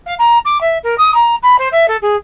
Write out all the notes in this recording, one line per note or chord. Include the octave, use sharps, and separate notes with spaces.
F5
A#5
D6
E5
A#4
D#6
A#5
B5
C5
E5
A4
G#4